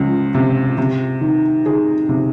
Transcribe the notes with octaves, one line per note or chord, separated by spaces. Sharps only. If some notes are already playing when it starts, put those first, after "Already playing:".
Already playing: C#2 F3
C3
C3
D#3
D#3 G#4
C3